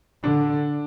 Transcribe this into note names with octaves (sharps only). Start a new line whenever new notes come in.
D3 D4